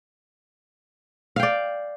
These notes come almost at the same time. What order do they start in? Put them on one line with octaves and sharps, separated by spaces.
F5 G5 D5